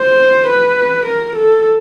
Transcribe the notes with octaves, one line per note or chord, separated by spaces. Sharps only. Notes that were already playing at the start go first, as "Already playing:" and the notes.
Already playing: C5
B4
A#4
A4